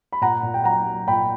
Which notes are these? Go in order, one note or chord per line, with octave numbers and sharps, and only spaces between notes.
B5
A#2 F#5 A#5
A#2
G5
F#3 F#5 A#5
F#3
A#2 G5 B5